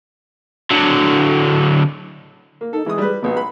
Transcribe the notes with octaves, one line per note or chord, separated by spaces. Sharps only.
D3 F#3
A#3
D#4 A4
E3 G#3 G#4 D#6
G3 B4
A#1 B2 B4
B5